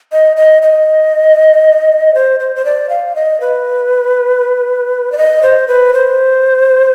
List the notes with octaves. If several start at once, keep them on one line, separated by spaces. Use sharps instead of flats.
D#5
D#5
D#5
C5
C5
C5
D5
F5
D#5
B4
D5
D#5
C5
B4
C5